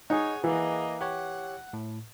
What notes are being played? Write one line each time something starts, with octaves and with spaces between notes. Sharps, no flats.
D#4 G#4 C#5 F#5 G#5
E3 A#3 D#5
G4 C#5 F#5
A2